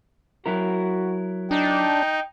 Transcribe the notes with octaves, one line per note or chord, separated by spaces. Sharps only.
F#3 E4 F#4 A#4
D4 D#4 G5